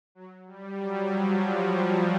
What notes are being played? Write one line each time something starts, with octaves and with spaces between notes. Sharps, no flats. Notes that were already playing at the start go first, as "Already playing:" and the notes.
F#3
G3
F#3
F3
G3
G3